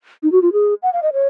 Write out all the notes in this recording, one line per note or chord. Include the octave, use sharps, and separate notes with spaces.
D#4
F#4
F4
G#4
F#5
F5
D#5
C#5